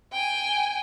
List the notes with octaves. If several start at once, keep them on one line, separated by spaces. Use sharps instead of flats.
G5 G#5